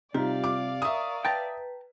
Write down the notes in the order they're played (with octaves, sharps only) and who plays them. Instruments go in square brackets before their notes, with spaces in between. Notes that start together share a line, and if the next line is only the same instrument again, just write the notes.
[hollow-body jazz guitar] C3 [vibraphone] G3 F4 G4 [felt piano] D#4 [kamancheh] D5 F5
[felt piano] D6
[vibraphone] A#4 A#5 C#6 [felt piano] E5 D#6
[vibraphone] B4 [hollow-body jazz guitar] G5 A5 A#5